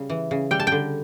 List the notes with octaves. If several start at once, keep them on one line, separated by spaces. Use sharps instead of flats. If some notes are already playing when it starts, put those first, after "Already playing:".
Already playing: C#3 G3
E3
C#3
G3 G5
A5
D3 G5